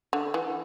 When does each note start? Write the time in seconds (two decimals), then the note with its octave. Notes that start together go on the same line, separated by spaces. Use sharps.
0.13 D3
0.34 E3